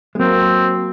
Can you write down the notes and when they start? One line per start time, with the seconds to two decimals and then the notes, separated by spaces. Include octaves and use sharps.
0.15 G#3
0.19 F#3 A#3 C4